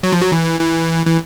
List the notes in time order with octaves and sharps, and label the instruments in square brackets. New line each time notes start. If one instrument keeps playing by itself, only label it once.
[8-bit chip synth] F#3
F3
F#3
E3
E3
E3